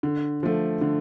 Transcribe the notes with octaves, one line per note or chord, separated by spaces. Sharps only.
D3
F3 A3
D3